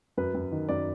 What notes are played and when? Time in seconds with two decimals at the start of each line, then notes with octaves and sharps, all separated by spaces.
0.17 F#2 B4
0.34 F#2
0.52 D#3
0.69 F#2 D5